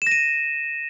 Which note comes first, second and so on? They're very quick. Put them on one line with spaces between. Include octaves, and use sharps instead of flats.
E7 A#6 D#7